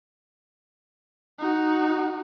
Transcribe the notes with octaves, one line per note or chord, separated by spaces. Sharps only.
D#4 F#4